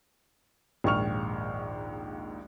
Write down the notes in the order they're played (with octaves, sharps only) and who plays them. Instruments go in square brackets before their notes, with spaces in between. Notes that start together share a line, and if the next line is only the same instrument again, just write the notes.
[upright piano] A#1 D#2 G#2 C#6 F6 F7